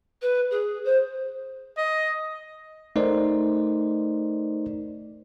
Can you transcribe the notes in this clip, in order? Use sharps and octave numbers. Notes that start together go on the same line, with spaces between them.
B4
G#4
C5
D#5
A3 D#4 A#4 C5 D5